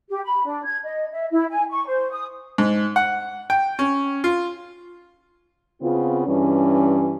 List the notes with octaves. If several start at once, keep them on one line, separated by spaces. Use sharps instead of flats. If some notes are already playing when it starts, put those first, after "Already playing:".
G4
B5
D4
G#6
D#5
E5
E4
G#5
C#6
C5
D#6
G#2
F#5
G5
C#4
F4
C#3 B3 C4 F4
G2 E3 C#4